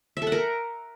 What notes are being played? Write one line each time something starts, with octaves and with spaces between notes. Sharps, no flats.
E5
A4
F#5
A#4